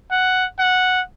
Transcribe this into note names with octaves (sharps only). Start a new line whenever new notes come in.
F#5
F#5